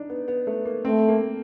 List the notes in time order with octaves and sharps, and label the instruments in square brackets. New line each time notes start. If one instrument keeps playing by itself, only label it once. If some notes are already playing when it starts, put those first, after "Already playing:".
Already playing: [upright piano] D4 D#4
B3
B3
A3
A#3
[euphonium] A3 [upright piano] C4
[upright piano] A#3